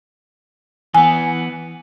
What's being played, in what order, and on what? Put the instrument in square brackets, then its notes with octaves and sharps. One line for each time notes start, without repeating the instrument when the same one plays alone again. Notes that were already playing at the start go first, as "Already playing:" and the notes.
[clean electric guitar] E3 B3 [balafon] G#5